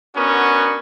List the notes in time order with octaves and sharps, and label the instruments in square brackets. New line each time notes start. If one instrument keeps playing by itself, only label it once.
[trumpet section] B3 C#4 D4 F#4 A#4